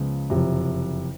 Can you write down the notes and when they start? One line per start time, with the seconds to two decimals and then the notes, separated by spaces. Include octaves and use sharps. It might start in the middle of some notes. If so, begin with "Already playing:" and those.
Already playing: C#2 C#3 F3 G#3 B3
0.30 F#1 F2 C3